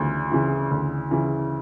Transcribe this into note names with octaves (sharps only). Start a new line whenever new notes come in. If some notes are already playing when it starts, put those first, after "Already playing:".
Already playing: D2 C#3 E3
C#3 E3
D2
C#3 E3